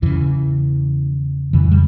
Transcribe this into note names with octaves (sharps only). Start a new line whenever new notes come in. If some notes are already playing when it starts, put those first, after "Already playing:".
E2 C#3 E3
F2 C#3 E3
G3